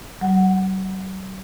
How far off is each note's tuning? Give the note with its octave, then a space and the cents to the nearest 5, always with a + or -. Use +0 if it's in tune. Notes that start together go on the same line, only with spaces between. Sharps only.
F#3 +45 F#5 +0